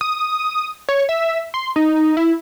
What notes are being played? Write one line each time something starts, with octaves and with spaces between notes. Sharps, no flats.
D#6
C#5
E5
C6
D#4
E4